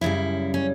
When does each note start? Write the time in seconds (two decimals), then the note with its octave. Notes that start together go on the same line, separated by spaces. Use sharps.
0.01 F#2 C#3 G3 E4
0.54 C#4